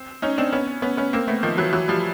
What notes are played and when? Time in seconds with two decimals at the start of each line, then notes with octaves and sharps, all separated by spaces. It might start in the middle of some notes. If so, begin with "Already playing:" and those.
Already playing: C4
0.22 C#4 D#4
0.38 C4 D4
0.53 B3 C#4
0.82 B3 C#4
0.97 B3 C#4
1.13 A#3 C4
1.27 A3 B3
1.43 D#3 F3
1.58 E3 F#3
1.73 E3 F#3
1.88 F3 G3